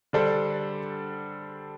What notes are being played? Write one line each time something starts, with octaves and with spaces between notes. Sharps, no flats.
D3 G3 D4 A4 C5